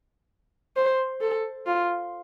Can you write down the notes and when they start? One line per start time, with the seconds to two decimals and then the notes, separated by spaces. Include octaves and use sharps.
0.76 C5
1.20 A4
1.66 F4